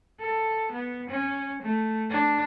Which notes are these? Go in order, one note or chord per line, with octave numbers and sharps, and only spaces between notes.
A4
B3
C#4
A3
D4